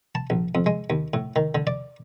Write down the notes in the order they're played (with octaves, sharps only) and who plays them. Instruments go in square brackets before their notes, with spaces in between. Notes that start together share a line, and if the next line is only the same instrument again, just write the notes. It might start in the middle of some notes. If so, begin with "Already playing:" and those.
[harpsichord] A5
A#1
F2
G#3
D#2
A2
D#3
D3
D5